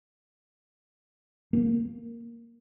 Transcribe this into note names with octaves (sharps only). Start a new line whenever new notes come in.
A#3